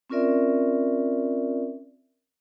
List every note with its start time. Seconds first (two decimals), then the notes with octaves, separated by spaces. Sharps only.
0.10 C4 C#4 F4 A#4 D5 E5